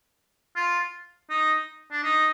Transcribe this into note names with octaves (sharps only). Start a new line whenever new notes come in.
F4
D#4
D4
D#4